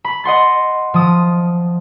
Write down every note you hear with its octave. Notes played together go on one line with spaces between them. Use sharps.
B5
D#5 F#5 C6 A6
F3 D#6